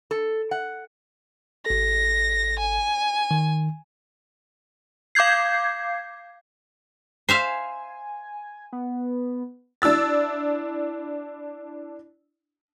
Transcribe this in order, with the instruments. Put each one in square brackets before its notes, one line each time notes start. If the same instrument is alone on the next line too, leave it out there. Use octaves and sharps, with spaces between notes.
[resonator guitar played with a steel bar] A4
F#5
[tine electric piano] G#1 A4 [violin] A#6
[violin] G#5
[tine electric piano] D#3
[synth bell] F5 D6 G6 G#6 C7
[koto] C5 E5 F5 [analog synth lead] G#5
[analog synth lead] B3
[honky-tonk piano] D4 E4 E6 A6